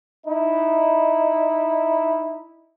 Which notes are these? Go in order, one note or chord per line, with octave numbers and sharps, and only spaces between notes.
D#4 E4